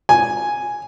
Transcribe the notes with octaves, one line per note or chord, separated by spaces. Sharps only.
G#5